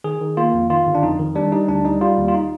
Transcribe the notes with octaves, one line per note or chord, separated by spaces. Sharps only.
D#3 G#4
D#3
A#3 F4
F2
D#3 F4
G1
D4
F2 D#4
D#3
G3 D4
G3 D#4
D2 D4
G3 D#4
G3 F4
D#2
F4
D#4